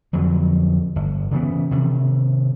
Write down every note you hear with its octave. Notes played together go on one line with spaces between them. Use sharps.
F2 D3 F#3
G1
C#3 E3 F#3 B3
C3 D#3